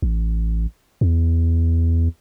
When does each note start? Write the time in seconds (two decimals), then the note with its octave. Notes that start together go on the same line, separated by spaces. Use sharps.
0.02 A1
1.01 E2